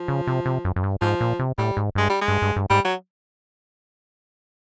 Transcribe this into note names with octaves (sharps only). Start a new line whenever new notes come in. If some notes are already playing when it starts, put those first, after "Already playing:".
Already playing: F3
C#3
C3
C3
F#2
F#2
G2
G#2 F3
A#2
C3
A2 G3
G#2
G2 G#3
G3
G#3
G2
G2
G2
G#2 G3
F#3